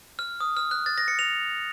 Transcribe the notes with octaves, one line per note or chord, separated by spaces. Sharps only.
F6
D#6
F6
F#6
A6
A#6
C#7
F7